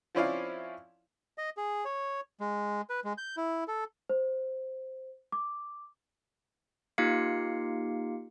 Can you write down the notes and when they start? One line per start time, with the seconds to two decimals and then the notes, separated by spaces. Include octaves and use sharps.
0.15 F3 C4 C#4 E4 D5 F5
1.38 D#5
1.57 G#4
1.85 C#5
2.40 G#3
2.90 B4
3.05 G#3
3.18 G6
3.37 E4
3.68 A4
4.09 C5
5.32 D6
6.98 A#3 D#4 F4 G4 F5 C#7